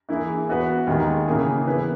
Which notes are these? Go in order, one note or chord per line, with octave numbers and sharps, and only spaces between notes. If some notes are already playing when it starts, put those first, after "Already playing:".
E3 A#3 E4 G#4
E3 B3 F#4 B4
D#2 D#3 G#3
C#3 E3 A#3 E4 G#4
E3 B3 E4 B4